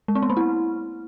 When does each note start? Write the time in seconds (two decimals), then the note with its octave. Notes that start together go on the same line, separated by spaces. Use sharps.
0.08 G#3
0.15 C4
0.22 B3
0.30 A#3
0.37 E4